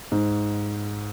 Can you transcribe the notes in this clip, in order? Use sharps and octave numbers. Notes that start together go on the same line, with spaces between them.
G#2